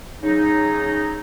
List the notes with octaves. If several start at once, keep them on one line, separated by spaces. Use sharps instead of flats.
C#3 F#3 C#4 D#4